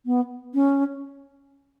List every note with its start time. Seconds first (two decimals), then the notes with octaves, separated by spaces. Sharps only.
0.06 B3
0.54 C#4